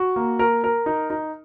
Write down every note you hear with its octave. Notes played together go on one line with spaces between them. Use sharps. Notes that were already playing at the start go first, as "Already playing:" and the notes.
Already playing: F#4
A#3
A#4
A#4
D#4
D#4